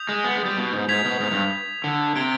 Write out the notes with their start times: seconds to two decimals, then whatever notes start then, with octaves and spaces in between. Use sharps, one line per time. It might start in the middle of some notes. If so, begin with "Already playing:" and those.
Already playing: D#6 G6 B6 F7
0.09 G#3
0.24 B3
0.35 G#3
0.46 G3
0.57 B2
0.72 G#2
0.88 G#2 G#6 B6 F7
1.05 B2
1.20 G#2
1.31 G2
1.84 D3
2.16 C3 G#6 D7 G7